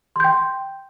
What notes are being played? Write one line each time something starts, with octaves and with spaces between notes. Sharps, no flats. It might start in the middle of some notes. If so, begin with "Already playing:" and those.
G5 C6 G6